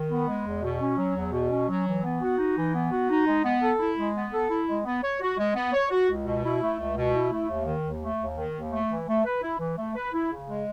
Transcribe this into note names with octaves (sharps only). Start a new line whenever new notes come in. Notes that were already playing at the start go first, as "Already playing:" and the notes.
Already playing: D#3
B3
G#3
E2
B2
C#4
F#3
E2
B2
C#4
F#3
E3
B3
F#4
D#4
E3
B3
F#4
D#4
G#3
B3
A4
E4
G#3
B3
A4
E4
G#3
B3
C#5
F#4
G#3
B3
C#5
F#4
C#2
B2
E4
A3
C#2
B2
E4
A3
D#2
D#3
D#2
A3
D#2
D#3
D#2
A3
E3
A3
B4
E4
E3
A3
B4
E4
C#3
G#3